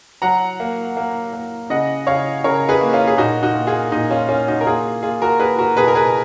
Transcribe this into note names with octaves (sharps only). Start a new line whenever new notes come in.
F#3 F#5 A#5
A#3
A#3
A#3
C#3 D#5 F#5
C#3 C#5 F5
C#3 A#4 C#5
G#4 B4
A#3
C#4 F4
G#4
A#2 D#4 F#4
D#4 F#4
A#3
F4 G#4
A#2 D#4
C#4 F4
A#3 C#4 F4
D#4 F#4
A#4
A#3 F4 G#4
A#3 F4 G#4
F#4 A#4
A#3 G#4 B4
F#4 A#4
B2 G#4 B4
A#4
G#4 B4